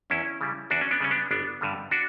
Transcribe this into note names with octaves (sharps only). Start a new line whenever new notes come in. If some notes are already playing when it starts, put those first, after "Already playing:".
E2 C#4 E4
C#3 G3
E2 D4 F#4
C#4
B3 D4
C#3 G3 C#4
B3 D4
G1 B3 D4
G2 D3 G3
D4 F#4